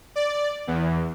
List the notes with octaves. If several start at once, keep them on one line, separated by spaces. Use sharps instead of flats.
D5
E2